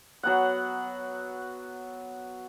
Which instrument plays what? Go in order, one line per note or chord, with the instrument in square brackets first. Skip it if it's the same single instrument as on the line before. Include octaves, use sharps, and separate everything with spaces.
[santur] F#3 B3 F#5